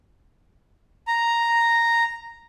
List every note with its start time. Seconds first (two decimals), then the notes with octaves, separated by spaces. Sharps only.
1.08 A#5